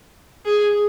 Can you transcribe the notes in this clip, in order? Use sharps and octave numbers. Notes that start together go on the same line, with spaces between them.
G#4